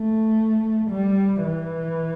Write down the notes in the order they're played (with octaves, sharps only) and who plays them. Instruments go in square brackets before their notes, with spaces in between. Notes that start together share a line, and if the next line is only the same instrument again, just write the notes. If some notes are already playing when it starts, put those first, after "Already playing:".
Already playing: [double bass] A3
G3
E3